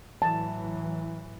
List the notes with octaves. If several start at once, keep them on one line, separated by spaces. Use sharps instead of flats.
A2 E3 F#3 A5